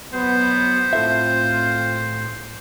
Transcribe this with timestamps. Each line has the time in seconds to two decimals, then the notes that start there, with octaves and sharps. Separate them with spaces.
0.14 B2 F#3 B3 C5
0.93 A2 C4 F4 A4 E5